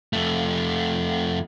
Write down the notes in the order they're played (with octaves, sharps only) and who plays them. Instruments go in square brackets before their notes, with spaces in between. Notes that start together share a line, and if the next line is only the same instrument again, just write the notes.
[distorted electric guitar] F2 A3